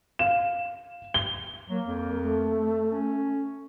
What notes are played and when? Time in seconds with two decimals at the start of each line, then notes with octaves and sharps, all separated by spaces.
0.19 F5 E7
1.14 G7
1.70 F#3 A#3
1.87 F2
2.23 A3
2.91 C#4